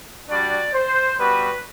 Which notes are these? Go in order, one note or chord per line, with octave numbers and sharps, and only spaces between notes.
G3 D4 F#4 D5
C5
G3 B3 F#4 B4